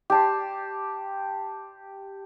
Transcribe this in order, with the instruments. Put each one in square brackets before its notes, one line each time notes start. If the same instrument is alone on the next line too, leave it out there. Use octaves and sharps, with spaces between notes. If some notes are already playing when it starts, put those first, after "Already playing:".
[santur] G4 A5 C6